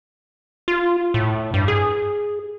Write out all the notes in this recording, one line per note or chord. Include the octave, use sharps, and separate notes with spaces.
F4
A2
G2
G#4